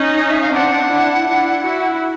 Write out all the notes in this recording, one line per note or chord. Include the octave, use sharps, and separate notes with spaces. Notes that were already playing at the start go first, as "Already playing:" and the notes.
Already playing: C#4 D#4
D#5
E5
F5
C4 D4 F#5
D4 E4
D4 E4
E4 F#4